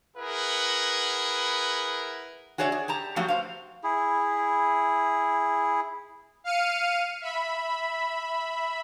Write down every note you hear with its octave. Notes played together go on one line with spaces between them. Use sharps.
E4 G#4 A#4 B4 F#5
F#4 G#4 C#5 D5 E5
G#4
G4 A5 A#5
F3 F#3 A3 F#4 G4
C5 F5
E4 G#4
F5 F6 C#7 D#7
E5 B5